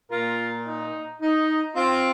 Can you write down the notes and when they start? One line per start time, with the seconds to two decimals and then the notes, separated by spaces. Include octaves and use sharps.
0.11 A#2 A#3 F4 A#4
0.67 D#4
1.21 D#4
1.75 C4 F4